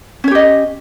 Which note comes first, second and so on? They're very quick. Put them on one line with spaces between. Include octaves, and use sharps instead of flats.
C#4 C#5 G4 D#5